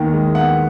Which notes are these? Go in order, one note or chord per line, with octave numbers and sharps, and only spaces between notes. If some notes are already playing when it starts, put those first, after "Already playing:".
Already playing: D#2 D#3 B3
G#3
B3 F#5